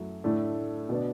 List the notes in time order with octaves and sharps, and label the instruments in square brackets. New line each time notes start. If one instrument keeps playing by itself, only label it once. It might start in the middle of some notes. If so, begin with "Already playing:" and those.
Already playing: [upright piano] F#2 F#3 A3 E4
A2 A3 D4
B2 B3 D4